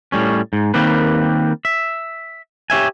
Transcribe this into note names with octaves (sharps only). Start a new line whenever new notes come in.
A2 G3 C#4
G#2
D#3 G3 A#3 C4 B4
E5
G4 C#5 E5 G#5